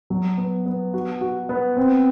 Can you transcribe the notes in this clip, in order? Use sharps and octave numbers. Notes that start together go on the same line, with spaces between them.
F#3
B3
B3
F#4
F#4
B3
C4